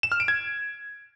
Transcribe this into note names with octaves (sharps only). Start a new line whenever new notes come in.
E7
F6
D7
G#6